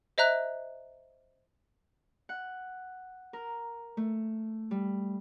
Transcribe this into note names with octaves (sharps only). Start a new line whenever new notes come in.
C5 D#5 E5 A#5 F#6
F#5
A#4
A3
G3